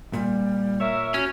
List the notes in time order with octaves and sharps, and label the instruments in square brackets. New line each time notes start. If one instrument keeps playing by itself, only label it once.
[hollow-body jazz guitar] A#2 [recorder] G3
[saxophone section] A#4 C#5 E5
[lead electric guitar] C#4 [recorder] F#4